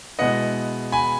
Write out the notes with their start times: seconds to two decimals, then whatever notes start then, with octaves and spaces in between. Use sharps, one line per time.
0.19 B2 G#3 B3 E4 D#5 F#5
0.92 G#5 B5